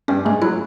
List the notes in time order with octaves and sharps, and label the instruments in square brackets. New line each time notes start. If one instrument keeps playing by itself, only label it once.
[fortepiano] G2 G3 [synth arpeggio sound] C#4
[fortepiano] G#2 G#3 [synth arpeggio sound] A3
[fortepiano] F#3 [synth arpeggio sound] E4